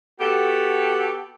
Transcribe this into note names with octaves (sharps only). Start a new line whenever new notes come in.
B3 F#4 G4 A4